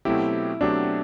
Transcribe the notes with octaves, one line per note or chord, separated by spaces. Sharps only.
B2 F#3 A3 C4 E4 G4
B2 F#3 A3 C4 D4 G4